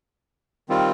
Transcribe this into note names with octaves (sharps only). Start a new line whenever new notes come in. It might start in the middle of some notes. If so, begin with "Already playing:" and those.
D#3 G3 C4 F4